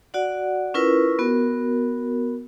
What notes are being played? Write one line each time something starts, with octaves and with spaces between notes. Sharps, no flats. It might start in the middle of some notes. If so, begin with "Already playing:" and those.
F#4 D5 F#5
C#4 E4 F4 A#4 B4
B3 F#4 A#4